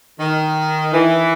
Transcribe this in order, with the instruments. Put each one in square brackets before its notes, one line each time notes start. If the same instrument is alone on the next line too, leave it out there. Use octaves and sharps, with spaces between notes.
[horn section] D#3
E3